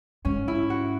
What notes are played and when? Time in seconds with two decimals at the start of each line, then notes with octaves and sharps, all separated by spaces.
0.25 G#2 C#4
0.48 E4
0.70 F#4